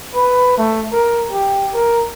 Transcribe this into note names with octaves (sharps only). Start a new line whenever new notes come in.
B4
A3
A#4
G4
A#4